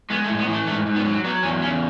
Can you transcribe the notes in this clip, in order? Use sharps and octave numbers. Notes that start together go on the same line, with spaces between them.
G#3 B3
A3
A2
B3
E3
A3
G#2 A3
G#2
B3
F#3
F#3 B3
E2 C#4
C#3 C#4